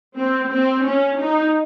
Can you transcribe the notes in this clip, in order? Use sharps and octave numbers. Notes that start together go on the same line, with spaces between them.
C4
C4
C#4
D#4